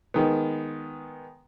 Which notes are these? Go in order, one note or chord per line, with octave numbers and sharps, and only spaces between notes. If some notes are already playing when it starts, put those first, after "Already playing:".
D#3 G#3 B3